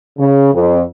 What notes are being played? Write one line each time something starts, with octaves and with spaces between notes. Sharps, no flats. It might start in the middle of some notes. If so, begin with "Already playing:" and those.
C#3
F2